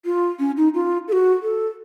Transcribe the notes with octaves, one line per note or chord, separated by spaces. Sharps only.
F4
C#4
D#4
F4
A4
F#4
A4